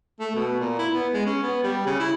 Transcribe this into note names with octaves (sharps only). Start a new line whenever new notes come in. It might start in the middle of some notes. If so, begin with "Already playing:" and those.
A3
B2
A#2
E4
B3
G#3
C#4
B3
G3
C#3
E4